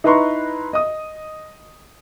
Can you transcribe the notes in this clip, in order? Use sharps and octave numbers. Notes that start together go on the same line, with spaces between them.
D#4 E4 B4 A#5 C6 C#6
D#5 D#6